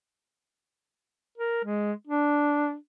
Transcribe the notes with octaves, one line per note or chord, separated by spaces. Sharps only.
A#4
G#3
D4